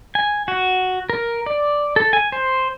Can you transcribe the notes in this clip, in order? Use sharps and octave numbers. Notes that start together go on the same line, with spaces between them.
G#5
F#4
A#4
D5
A4
G#5
C5